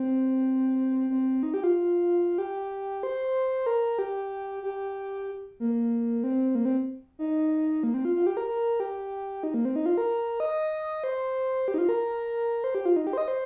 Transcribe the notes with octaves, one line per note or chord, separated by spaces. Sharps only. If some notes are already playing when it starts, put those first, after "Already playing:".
Already playing: C4
C4
D#4
G4
F4
G4
C5
A#4
G4
G4
A#3
C4
A#3
C4
D#4
A#3
C4
F4
F4
G4
A#4
A#4
G4
D#4
A#3
C4
D#4
F4
A#4
D#5
C5
G4
D#4
F4
A#4
C5
G4
F4
D#4
G4
C5
D#5
C5